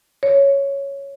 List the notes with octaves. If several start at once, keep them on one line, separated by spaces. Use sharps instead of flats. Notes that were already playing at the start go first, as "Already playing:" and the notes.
C#5